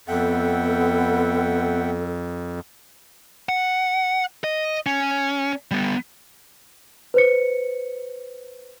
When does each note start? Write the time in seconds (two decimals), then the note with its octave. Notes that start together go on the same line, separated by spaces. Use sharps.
0.08 F2 B3 A4 E5 F#5 G5
3.49 F#5
4.44 D#5
4.86 C#4
5.71 G3 B3
7.14 B4 C5 C#7